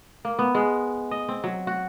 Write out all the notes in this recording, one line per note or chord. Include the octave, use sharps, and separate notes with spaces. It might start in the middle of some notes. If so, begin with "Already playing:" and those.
A#3
B3
G#3
D#5
C4
F#3
F#4